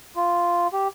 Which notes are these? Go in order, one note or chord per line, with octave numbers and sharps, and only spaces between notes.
F4
G4